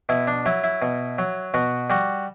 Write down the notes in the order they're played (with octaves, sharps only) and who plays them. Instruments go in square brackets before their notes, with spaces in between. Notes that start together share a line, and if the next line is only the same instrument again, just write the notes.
[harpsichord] B2 E4
D4
F#3 E4
E4
B2
F#3
B2 F#4
G3 F#4